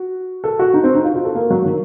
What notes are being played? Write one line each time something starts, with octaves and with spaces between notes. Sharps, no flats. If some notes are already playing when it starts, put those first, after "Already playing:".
Already playing: F#4
A4
F#4
D#4
C4
D#4
F4
F#4
A4
A#3
F#3
D#3